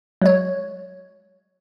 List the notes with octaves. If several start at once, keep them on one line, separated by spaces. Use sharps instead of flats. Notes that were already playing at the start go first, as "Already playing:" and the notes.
F#3 G#3 C#5